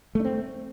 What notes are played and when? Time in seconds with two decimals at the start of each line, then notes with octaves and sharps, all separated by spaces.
0.15 A3
0.20 D4
0.24 C4